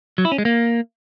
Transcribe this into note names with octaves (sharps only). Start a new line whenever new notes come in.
F#3
E4
C#4
G#3
A#3